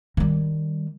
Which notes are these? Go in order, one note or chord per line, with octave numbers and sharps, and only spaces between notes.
D#3 G3